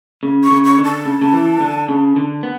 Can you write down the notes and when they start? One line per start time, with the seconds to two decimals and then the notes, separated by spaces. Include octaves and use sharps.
0.23 C#3
0.44 C#6
0.51 C#3
0.65 C#6
0.78 D3
0.85 A5
1.05 C#3
1.21 C#3
1.33 E3
1.60 D3
1.88 C#3
2.16 D3
2.43 B3